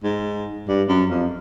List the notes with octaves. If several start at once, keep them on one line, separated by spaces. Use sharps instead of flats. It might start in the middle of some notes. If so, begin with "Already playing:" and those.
G#2
G2
F#2
F2